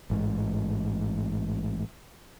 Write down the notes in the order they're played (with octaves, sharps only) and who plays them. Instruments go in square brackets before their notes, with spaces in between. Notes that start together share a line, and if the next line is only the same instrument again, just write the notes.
[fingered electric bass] A1 G#2